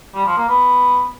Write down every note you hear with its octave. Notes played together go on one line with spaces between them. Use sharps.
G3
F3
A#3
B3